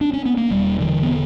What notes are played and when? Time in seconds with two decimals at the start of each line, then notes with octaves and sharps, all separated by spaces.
0.01 D4
0.13 C#4
0.25 B3
0.37 A#3
0.50 E1 G3
0.80 D3 E3
1.02 B3
1.10 D3